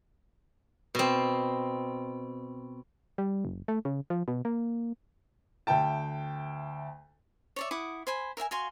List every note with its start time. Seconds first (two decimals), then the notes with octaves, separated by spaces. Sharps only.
0.95 B2 C4
3.18 G3
3.45 F#1
3.68 A3
3.85 C#3
4.10 F3
4.28 B2
4.45 A#3
5.67 D2 E5 G5 A5
7.56 C#5 D5 E5
7.71 E4 F#5 D6 D#6
8.07 C5 G#5 B5
8.37 A#4 E5 G5 G#5
8.51 F#4 F5 G#5 C6